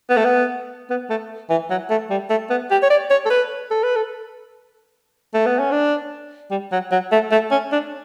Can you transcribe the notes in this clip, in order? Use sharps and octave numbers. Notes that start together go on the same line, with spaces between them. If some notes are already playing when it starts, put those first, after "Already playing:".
B3
A3
B3
B3
A3
E3
F#3
A3
G3
A3
B3
G4
C#5
D5
C#5
A4
B4
A4
B4
A4
A3
B3
C#4
D4
G3
F#3
F#3
A3
A3
C#4
D4